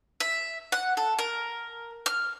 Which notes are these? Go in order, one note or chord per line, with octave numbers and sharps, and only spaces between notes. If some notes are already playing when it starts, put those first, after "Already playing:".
E5
F#5
A4
A#4
F6